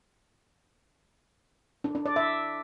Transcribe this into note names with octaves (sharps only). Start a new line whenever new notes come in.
D4
D4
D5
E5